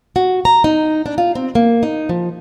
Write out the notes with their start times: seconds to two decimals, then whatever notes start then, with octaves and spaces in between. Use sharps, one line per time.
0.16 F#4
0.45 A#5
0.64 D#4
1.06 D4
1.18 F4
1.35 C4
1.55 A#3
1.83 D#4
2.09 F3